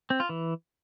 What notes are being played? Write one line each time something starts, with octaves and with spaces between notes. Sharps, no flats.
C4
F4
E3